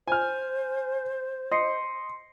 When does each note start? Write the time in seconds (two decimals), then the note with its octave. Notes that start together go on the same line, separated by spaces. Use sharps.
0.08 C5 G#5 F6
1.52 D#5 C6 C7 C#7